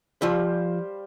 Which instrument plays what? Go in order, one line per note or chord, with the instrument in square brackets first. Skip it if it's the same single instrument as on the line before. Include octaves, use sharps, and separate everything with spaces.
[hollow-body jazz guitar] F3 F4 E5 [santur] G3 C5 F5